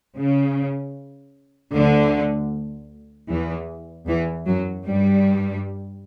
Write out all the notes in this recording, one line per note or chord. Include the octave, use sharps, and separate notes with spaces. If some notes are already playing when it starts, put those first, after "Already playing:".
C#3
D2 D3
E2 E3
E2 E3
F#2 F#3
G2 G3